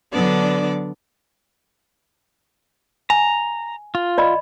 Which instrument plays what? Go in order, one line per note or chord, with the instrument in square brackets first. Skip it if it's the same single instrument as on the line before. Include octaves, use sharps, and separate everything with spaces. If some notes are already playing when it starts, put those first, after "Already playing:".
[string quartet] D3 F#3 B3 D4 D5
[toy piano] G#5 [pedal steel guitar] A#5
[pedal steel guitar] F4
[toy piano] D5 D#5 B5